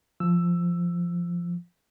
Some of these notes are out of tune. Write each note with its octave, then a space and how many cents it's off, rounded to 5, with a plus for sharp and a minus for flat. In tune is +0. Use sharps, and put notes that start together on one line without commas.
F3 -10 E6 +10